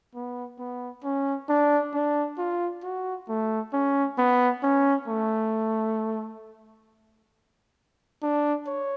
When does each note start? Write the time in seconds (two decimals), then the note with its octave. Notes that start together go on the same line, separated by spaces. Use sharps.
0.15 B3
0.59 B3
1.04 C#4
1.49 D4
1.94 D4
2.38 F4
2.83 F#4
3.28 A3
3.73 C#4
4.18 B3
4.63 C#4
5.08 A3
8.23 D4
8.67 C#5